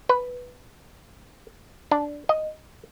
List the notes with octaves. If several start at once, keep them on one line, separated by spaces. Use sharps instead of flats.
B4
D4
D#5